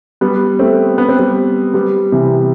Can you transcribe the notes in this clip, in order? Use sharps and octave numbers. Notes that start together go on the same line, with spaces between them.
G3 B3
A3 C4
B3
C4
G3 B3
G3 B3
C3 E3